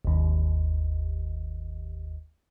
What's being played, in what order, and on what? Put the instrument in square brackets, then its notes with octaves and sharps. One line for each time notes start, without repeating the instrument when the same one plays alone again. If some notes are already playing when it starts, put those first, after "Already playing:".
[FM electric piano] G1 D#2